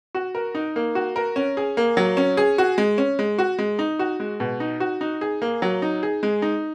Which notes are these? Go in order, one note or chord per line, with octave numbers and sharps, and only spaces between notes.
F#4
A#4
D#4
A#3
F#4
A#4
C#4
G#4
A#3
F#3
C#4
G#4
F#4
G#3
C#4
G#3
F#4
G#3
D#4
F#4
G#3
B2
D#4
F#4
D#4
G#4
A#3
F#3
D#4
G#4
G#3
D#4